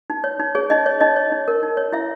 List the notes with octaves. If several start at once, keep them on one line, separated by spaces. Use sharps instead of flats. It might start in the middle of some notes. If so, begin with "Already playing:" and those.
D#4
C#5
D#4
G#4 C#5
D#4 D#5
C#5
D#4 D#5
C#5
D#4
A#4
D#4
C#5
E4 E5